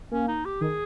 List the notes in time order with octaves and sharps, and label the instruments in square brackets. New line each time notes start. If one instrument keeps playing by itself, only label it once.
[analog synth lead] A#3 [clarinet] C#4
[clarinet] D#4
G4
[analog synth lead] D#3 [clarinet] G#4